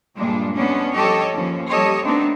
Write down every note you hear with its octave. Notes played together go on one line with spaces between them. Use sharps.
G2 A#2 G3 G#3 D4
G#3 B3 C#4 D4
F3 G3 G4 A4 C#5 D#5
D#2 F3 C#4
G3 G4 A4 C#5 D#5
A3 B3 C4 D4 D#4